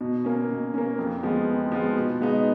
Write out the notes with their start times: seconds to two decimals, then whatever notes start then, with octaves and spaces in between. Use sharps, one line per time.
0.01 B2
0.25 A#3 C#4
0.49 B2
0.74 A#3 C#4
0.98 F2
1.23 F3 G#3 B3
1.47 F2
1.72 F3 G#3 B3
1.96 B2
2.21 G#3 B3 D#4